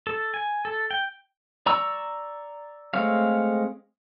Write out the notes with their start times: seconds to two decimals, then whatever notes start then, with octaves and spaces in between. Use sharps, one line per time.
0.07 A4
0.34 G#5
0.65 A4
0.91 G5
1.66 D5 A#5 C#6 E6
2.94 G#3 A3 C4 C#5 F5